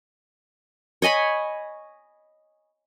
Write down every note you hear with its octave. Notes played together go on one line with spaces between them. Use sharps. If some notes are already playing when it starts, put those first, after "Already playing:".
C#5 D#5 G#5 B5